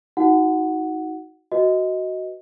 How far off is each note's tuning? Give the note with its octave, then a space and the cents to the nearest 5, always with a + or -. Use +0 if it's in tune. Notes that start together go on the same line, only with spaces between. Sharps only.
D#4 +25 F#4 +0 F#5 +0
F#4 +10 B4 -10 D#5 +15